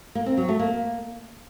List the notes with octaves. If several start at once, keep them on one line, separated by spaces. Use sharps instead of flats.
A#3
C4
F#3
A3
A#3